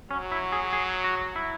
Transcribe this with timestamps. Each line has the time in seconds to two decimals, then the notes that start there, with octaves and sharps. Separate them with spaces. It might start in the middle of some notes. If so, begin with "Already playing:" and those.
0.10 F#3 C#4
0.31 E4
0.52 G#4
0.73 G#4
1.04 F#4
1.36 E4